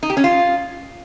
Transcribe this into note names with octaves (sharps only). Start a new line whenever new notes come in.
D#4
G4
C#4
F4